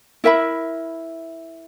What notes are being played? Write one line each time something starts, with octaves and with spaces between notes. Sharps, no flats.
E4 A#4 E5 B5